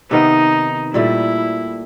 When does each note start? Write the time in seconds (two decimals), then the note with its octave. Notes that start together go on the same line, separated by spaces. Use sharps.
0.11 C3 D#3 B3 D#4
0.94 A#2 G3 A3 E4